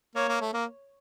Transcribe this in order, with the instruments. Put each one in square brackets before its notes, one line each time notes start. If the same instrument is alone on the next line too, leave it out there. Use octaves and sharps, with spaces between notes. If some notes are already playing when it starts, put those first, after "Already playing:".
[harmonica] A#3 [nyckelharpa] C#5
[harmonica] A#3
A3
A#3